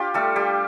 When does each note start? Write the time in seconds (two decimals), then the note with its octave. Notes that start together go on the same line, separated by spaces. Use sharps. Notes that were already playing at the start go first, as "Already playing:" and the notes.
Already playing: D4 F4 G4
0.14 G3 A3 A4
0.36 G3 G4